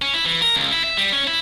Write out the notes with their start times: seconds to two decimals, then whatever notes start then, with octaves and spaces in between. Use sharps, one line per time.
0.02 C#4
0.14 E4
0.26 E3
0.42 A#4
0.55 C#2
0.71 E4
0.84 E5
0.97 G3
1.12 C#4
1.27 E4